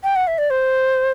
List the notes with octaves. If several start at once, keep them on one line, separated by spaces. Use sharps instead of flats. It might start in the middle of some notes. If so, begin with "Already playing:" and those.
G5
F#5
E5
D5
C5